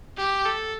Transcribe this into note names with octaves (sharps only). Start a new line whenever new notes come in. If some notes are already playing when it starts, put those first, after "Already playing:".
G4
A4